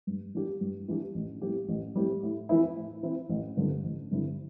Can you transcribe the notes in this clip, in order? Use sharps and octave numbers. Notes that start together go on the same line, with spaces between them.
G2
E3 G3 D4 G4
G2
E3 G3 D4 G4
A1
A2 G3 C4 G4
A1
A2 G3 C4 G4
A2
E3 C4 E4
A2
E3 C4 E4
A1
G2 D3 C4 E4
A1
G2 D3 C4 E4